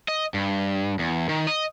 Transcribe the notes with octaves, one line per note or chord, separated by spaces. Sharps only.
D#5
G2
E2
D#3
D#5